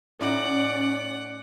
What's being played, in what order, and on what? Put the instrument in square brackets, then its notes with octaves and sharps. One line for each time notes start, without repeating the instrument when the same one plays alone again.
[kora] A2 D#4 [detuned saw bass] C#4 [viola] D5 [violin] F#5